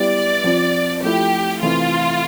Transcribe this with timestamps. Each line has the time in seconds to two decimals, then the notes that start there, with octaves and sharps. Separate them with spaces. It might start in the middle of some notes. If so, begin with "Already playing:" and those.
Already playing: G3 B3 E4 G4 D5
0.44 F3 C4 F4
1.03 F3 A3 E4 G4
1.61 C3 E3 A3 C4 E4 F4